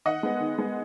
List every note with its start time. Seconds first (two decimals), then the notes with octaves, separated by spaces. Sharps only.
0.05 D#3 D#5 F#5
0.23 G#3 B3
0.40 D#3
0.58 G#3 B3